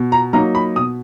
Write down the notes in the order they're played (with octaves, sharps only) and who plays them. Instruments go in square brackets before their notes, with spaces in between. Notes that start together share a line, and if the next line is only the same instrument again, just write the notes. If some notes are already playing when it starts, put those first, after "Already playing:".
Already playing: [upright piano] B2
A#5
F#3 A#3 D#4 A#5
B5
B2 D#6